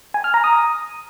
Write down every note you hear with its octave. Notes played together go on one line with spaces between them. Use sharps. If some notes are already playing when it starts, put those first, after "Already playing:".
G#5
F6
A#5
D#6